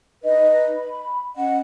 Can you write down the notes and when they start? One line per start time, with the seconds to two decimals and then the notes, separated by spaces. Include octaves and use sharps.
0.24 D#4 B4 D#5
0.77 B5
1.36 C#4 D#5 F#5